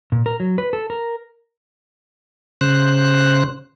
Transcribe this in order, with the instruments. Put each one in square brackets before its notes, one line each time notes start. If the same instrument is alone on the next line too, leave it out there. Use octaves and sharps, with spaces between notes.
[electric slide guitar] A#2
A#4
F#3
B4
A4
A#4
[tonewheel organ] C#3 C5 F#6